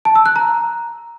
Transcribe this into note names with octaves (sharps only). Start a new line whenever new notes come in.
A5
E6
F#6
A#5